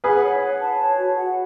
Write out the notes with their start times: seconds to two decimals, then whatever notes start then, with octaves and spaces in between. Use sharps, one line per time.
0.04 G#4 B4 F#5
0.23 C#5
0.42 F#5
0.61 A5
0.79 C#5
0.98 F#4
1.17 F#5